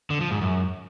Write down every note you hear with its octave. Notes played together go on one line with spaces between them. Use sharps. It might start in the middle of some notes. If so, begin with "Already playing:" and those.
D3
F3
G#2
F#2